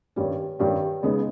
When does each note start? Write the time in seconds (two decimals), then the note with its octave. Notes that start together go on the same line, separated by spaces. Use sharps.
0.16 G2 D#3 G3 C#4
0.59 G2 D#3 G3 C#4
1.03 C#3 G#3 B3 D#4